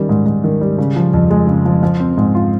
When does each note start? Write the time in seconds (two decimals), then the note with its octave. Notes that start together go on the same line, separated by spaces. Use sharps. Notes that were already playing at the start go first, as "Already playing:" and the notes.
Already playing: D#3 G3 C#4
0.09 G#2
0.26 G#2
0.44 D#3
0.61 G3
0.78 C#3
0.96 F3
1.14 F2
1.30 G#3
1.47 C#3
1.65 F3
1.83 F3
2.00 C4
2.18 G#2
2.35 F4